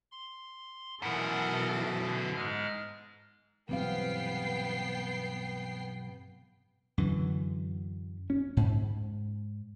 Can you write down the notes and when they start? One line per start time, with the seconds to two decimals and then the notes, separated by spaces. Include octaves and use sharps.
0.11 C6
1.02 F#2 B2 E3 A4 A#4 F#5
2.06 D3
2.36 G#2 G#3 F6
3.69 B1 G2 E3 B3 C4 F5 G5 C7
6.98 F#2 D3 E3
8.30 C#4
8.57 G#2